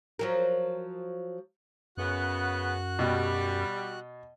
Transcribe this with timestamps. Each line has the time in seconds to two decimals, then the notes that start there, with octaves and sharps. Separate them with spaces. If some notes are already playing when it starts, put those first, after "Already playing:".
0.19 F3 F#3 A#4
1.97 F#2 C#3 B3 F#4 F#6
2.99 B2 G3